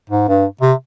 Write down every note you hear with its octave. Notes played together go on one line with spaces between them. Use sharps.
G#2
G2
C3